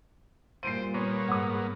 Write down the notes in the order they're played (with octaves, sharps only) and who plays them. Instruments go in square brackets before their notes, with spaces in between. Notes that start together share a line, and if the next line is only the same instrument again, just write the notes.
[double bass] A#2 G3 [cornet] C5 [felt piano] C7 D7 D#7
[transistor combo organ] A#3 B3 [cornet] C#5
[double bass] G#2 [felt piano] F#5 D#6